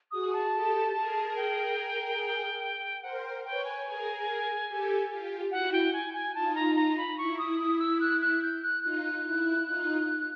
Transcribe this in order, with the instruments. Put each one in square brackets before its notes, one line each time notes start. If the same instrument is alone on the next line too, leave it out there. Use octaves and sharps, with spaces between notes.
[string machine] F#4 G#4 [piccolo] D#6
[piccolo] A5
[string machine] G4 A4
G#4 A#4
[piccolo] G5
[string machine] A#4 C5 [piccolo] F#5
[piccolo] G5
[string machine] B4 C#5 [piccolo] G5
[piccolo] G#5
[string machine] G#4 A#4
G4 A4
F4 G4
[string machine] E4 F#4 [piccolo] F#5
[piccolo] G5
G#5
G#5
[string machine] D#4 F4 [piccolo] A5
[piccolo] A#5
A#5
B5
[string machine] E4 [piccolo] C#6
[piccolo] D#6
D#6
E6
F#6
F#6
G6
F#6
[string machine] D#4 F4 [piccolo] F#6
[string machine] E4
D#4 F4